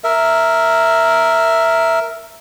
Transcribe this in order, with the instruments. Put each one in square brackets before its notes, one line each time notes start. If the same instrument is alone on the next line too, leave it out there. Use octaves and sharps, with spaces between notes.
[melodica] A#4 E5